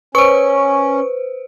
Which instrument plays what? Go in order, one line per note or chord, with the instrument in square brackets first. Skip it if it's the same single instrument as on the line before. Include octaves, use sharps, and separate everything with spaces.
[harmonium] C#4 [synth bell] B4 C5 [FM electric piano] C#6